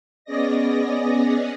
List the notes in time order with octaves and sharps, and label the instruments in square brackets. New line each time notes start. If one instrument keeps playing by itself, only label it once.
[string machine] B3 C#4 G#4 D5 D#5 A#6